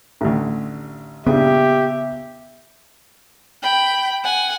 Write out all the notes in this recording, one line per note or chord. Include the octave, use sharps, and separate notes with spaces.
A1 D2
A#1 G2 C#3 B3 G4 E5
G5 B5
F#5 G#5